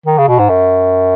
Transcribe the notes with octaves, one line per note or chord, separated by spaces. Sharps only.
D#3
C#3
B2
G#2
F#2